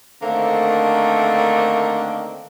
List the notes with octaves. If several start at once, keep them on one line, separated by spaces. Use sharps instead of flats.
D3 D#3 A3 A#3 C4 D4